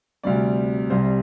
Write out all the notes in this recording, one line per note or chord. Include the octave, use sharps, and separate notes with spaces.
D2 C3 G3 C4 D5
C2 C3 G3 C4 C5